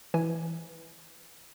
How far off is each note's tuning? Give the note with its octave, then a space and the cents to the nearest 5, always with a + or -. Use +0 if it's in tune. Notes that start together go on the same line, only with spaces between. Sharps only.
E3 +0 G#5 +0